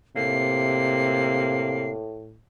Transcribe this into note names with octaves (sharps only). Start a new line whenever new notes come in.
A2 C3 A#3 C7